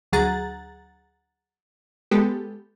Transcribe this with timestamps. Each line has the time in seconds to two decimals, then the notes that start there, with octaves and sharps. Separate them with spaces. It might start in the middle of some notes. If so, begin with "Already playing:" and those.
0.13 D2 F#3 G#4 F#5 A#5 A6
2.11 G#3 B3 G4 A4